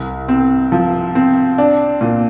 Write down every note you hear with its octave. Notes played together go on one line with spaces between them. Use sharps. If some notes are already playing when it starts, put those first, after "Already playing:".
Already playing: C2
C4
F3
C4
D4
A#2